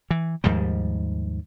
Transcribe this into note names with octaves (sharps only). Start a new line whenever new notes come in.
E3
D#2 G#2 F3 G3